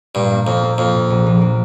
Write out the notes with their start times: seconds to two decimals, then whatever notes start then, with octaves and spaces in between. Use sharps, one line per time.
0.15 G2 A#2
0.31 A#3
0.47 F2 A#3
0.63 A#3
0.78 F2 F4
0.95 A#2
1.10 A#1
1.27 A#1
1.41 A#3